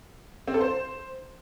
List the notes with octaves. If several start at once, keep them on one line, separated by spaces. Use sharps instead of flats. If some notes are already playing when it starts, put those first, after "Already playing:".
C4
A4
C5